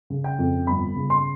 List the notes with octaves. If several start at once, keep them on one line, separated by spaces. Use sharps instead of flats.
C#3
G5
F2
G1 B5
C#3
C6